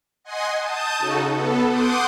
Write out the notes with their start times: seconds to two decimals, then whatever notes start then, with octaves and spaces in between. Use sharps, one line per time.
0.24 D#5 F#5 G#5 C6 C7 D#7
0.59 A5 D#6 G6
0.99 C#3 D#4 F#4 A4
1.30 B3 A4
1.67 F#5 C6 D6 D#6 G6